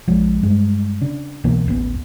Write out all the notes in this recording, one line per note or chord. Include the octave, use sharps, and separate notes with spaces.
A#1 F3 G#3
G2 G3 G#3
C#3 D4
C2 B2 E3 A#3
D#1 A1 B3